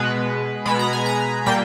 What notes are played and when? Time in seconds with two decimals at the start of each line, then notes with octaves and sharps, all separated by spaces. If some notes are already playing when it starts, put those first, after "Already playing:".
Already playing: B2 G#3 B3 B4
0.65 B2 G#3 B3 B5
0.79 A#5
0.93 G#5
1.06 A#5
1.46 A#2 G3 A#3 G5